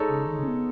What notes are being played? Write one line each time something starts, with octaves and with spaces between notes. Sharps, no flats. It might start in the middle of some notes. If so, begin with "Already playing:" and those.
Already playing: G#3 D#4 A4 C#5
C#3
D#3
C#3
C#4
B3